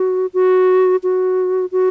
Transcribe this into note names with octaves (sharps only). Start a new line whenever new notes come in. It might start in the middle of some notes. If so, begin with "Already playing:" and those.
Already playing: F#4
F#4
F#4
F#4